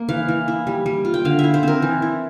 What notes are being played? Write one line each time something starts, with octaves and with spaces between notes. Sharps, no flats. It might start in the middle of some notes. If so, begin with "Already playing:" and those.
Already playing: A#3
E3 F5
E3
E4
G3
G3
F4
G5
D3 F5
E5
E4
C5
C4 A#4
E3
E4